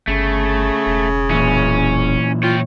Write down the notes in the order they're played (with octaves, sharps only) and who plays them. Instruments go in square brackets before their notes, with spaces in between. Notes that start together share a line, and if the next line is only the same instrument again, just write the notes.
[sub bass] G1 [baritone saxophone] C#3 [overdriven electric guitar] A3
[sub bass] E1
[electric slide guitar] A#2 E3 E4 [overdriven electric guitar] C#4
[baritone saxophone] F4 [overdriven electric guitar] C#5 G5